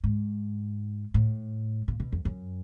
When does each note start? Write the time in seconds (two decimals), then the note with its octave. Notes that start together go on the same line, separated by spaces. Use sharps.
0.04 G#2
1.14 A2
1.88 A#2
2.00 B2
2.12 F2
2.25 F#2